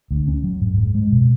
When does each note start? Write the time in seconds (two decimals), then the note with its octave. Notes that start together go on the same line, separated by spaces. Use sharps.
0.11 D2
0.28 C#4
0.44 F#3
0.61 G#2
0.77 G#2
0.95 G#3
1.12 B2